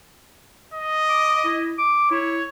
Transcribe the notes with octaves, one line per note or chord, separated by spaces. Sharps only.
D#5
D6
E4
D6
E4 C#5